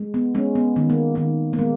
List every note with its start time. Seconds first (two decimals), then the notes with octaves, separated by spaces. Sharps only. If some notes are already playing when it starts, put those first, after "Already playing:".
Already playing: G#3
0.14 B3
0.35 G#3 C#4
0.55 B3
0.76 D#3 B3
0.90 A#3
1.15 D#3 A#3
1.53 A#3
1.59 G#3 B3